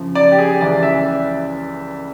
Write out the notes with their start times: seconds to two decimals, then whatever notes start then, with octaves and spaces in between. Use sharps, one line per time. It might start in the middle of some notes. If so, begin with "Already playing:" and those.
Already playing: F#2 C#3 F3
0.15 D5
0.32 G4
0.38 G#4
0.61 C#2 C#3 E3 D5
0.83 E5